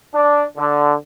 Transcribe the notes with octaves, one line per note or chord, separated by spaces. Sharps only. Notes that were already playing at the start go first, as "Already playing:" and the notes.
D4
D3